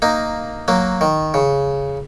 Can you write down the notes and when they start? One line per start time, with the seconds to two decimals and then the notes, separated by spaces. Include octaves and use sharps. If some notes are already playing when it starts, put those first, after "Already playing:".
0.02 A#3 D#4
0.68 F#3 A#3
1.01 D#3
1.34 C#3